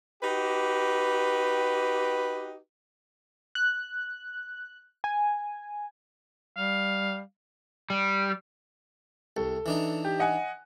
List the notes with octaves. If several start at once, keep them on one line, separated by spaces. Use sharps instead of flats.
D#4 F#4 G4 B4
F#6
G#5
G3 F5
G3
C2 A4
E3 D4 D#4
G4
D#5 F#5 G#5